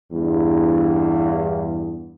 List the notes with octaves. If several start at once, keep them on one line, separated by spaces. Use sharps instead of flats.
E2 G2